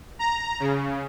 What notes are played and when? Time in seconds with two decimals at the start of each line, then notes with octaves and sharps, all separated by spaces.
0.19 A#5
0.60 C#3